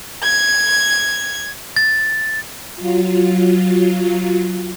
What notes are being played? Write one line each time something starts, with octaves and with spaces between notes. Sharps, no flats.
G#6
A6
F#3 F4